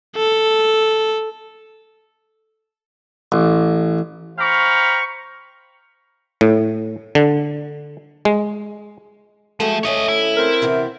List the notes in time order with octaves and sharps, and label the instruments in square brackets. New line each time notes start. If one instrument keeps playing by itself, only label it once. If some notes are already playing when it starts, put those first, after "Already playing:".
[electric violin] A4
[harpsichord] A1
[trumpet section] C5 F5 G5 A#5 B5 C#6
[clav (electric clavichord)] A2
D3
G#3
[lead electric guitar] F3 [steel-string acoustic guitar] G#3 A3 F#4
[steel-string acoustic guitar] D2 A3 C#4 [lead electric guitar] C#5 D#5
[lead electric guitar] E4
[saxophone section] C4 A#4
[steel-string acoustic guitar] C3 E3 B3